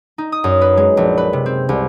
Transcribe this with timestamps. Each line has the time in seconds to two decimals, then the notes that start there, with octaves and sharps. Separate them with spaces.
0.18 D#4
0.32 D#6
0.44 F#2
0.61 B4
0.77 G#3
0.97 A#1
1.17 B4
1.33 C3
1.46 C4
1.69 C2